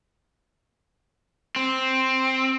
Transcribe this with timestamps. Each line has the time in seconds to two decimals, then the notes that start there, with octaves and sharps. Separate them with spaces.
1.56 C4